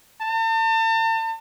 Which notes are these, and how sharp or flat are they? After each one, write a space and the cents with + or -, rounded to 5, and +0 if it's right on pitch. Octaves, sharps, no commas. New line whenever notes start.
A5 +40